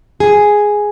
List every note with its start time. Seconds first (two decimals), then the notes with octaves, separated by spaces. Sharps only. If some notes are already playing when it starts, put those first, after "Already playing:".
0.20 G#4